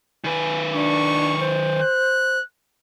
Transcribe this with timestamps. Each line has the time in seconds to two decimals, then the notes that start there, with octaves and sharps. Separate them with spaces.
0.24 D#3 B4 G#5
0.74 D4 C#6
1.40 C5
1.82 F#6